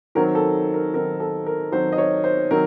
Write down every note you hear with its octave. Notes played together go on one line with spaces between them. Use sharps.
D#3 F#3 C4 A#4
A4
A#4
D#3 F#3 C4 A#4
A4
A#4
D#3 F#3 C4 C5
D#5
C#5
C5
D#3 F#3 C4 A#4